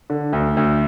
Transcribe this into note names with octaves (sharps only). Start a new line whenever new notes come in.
D3
D2
D2